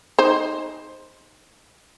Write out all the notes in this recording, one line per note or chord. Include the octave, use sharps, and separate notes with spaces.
D#4 C5